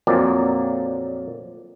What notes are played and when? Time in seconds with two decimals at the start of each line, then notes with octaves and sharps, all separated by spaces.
0.07 F2 A#2 F#3 A#3 C4 D5